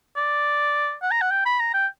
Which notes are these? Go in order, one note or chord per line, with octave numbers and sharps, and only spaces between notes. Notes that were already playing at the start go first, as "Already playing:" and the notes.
D5
F#5
A#5
F#5
G5
B5
A#5
G5